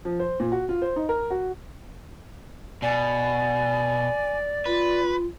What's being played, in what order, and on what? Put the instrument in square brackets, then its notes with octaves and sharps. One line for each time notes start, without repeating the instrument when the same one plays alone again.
[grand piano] F3
C5
A#2
F#4
F4
C5
D#4
A#4
F#4
[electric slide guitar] B2 [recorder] D5 [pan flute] G#5
[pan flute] F4 [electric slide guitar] B4